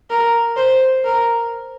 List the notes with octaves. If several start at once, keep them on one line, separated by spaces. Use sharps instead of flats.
A#4
C5
A#4